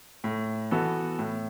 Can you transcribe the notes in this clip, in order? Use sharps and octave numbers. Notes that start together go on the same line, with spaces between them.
A2
E3 B3 F#4 A4
A2